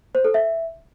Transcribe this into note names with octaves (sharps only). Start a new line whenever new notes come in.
C5
A4
E5